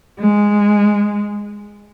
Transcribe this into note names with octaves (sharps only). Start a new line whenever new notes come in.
G#3